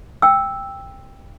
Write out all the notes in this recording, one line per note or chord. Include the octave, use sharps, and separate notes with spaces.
G5 E6